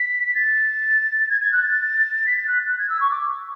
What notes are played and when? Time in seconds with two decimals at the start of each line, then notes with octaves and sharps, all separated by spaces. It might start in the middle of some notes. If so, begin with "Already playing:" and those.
Already playing: B6
0.35 A6
1.30 G#6
1.41 G#6
1.52 F#6
1.63 A6
2.26 B6
2.37 A6
2.48 F#6
2.69 F#6
2.79 G#6
2.90 E6
3.01 C#6
3.11 D6